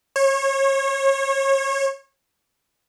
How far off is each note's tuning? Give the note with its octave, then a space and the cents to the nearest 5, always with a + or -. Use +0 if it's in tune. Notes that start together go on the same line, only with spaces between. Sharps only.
C#5 -30